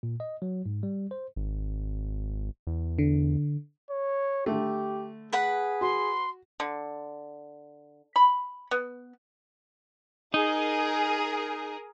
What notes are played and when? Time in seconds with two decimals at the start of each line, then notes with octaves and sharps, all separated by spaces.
0.03 A#2
0.20 D#5
0.42 F#3
0.66 G#2
0.83 G3
1.11 C5
1.36 G#1
2.67 E2
2.98 D3
3.90 C#5
4.46 D3 A3 G4
5.33 G#4 B4 F#5 B5
5.81 F#4 C6
6.60 D3
8.16 B5
8.71 B3
10.34 D#4 G#4 A#4